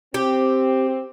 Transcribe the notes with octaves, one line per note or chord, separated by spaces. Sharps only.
C4 G4